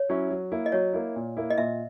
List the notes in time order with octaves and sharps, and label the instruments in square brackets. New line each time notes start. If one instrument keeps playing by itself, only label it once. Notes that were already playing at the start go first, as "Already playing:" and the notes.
Already playing: [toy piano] C#5
[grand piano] F#3 C#4 E4
F#3
A#3 E4
[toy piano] D#5
[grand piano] F#3 [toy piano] C#5
[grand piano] A#3 E4
A#2
A#3 E4
[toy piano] D#5
[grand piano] A#2 [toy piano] E5